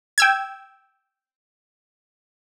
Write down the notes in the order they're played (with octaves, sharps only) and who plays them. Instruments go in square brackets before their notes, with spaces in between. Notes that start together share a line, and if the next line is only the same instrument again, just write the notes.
[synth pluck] G5 E6 G#6